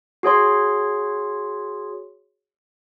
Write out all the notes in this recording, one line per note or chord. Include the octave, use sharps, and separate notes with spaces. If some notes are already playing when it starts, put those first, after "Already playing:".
F#4 G#4 C#5 C6